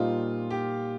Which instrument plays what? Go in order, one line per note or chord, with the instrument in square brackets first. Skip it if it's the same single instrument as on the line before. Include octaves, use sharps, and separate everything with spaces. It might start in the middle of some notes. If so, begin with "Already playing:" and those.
Already playing: [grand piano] A#2 G3 D#4 C5 [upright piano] F4
[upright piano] G4